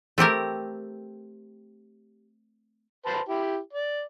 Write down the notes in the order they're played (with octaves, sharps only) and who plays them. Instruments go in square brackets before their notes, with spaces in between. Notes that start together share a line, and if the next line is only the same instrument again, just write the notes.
[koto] A3 C4 G4 A#4
[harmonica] B4 C5 A5
E4 G4
D5